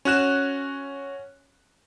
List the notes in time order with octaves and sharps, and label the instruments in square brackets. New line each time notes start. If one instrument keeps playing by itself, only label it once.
[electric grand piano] C#4 F#4 F#6 E7